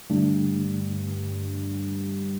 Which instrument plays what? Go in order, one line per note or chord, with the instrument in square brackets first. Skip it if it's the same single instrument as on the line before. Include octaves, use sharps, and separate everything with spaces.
[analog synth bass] G2 [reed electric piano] D3 A3 D4